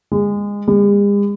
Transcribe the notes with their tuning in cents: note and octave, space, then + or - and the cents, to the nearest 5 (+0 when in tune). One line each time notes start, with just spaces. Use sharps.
G#3 -25
G#3 -45